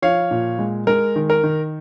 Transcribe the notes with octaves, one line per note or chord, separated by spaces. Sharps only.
F3 C#5 F5
A#2
G#3
G#3 A#4
D#3
A#4
D#3